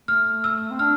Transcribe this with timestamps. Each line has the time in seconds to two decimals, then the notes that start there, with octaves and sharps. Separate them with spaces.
0.08 A3 F6
0.44 E6
0.71 C4
0.79 D4 F6